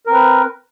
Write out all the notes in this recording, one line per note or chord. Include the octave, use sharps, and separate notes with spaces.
C4 A#4 B4